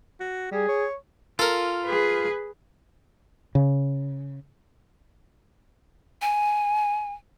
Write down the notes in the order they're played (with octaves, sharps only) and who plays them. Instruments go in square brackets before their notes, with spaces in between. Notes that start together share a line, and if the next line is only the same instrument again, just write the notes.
[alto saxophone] F#4
[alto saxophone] G3 [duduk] G#4
[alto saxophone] C#5
[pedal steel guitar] F4 [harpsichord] A4 A#4
[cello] G#4 B4
[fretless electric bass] C#3
[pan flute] G#5